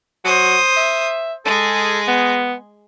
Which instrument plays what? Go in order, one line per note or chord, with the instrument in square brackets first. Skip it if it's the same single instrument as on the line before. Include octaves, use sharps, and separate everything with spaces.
[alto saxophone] F#3 [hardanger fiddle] C5 D#6
[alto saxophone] E5
[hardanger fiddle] G#3 G#4 [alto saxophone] A4
[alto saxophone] B3